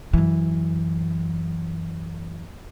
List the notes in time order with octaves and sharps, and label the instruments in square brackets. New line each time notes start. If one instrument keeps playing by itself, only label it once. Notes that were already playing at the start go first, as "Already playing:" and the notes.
[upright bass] F#2 E3